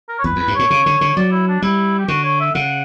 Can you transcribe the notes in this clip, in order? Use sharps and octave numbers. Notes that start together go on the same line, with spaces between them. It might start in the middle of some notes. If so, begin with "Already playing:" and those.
A#4
C#5
E2 B4
E2 B4
G2
A#2 C#5
C#3
D3
D3
C#5
F#3 D5
E4
D4
G3 E4
G4
D3 F#4
C#5
E5
C#3 F#5